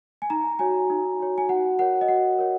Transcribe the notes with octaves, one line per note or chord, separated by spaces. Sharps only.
G#5
D#4 A#5
F#4 C#5 G#5
D#4
F#4 C#5
G#5
F#4 F#5
A#4 C#5 F#5
D#5
F#4 F#5
A#4 C#5